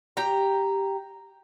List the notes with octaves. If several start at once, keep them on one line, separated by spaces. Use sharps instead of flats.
G4 A#5